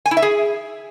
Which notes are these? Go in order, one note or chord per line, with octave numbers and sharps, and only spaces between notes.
G#5
E4
E5
G#4